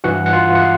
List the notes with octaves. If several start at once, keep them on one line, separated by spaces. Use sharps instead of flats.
G2 E3 F#4 F#5
F#5
F4 F5
F#5
F5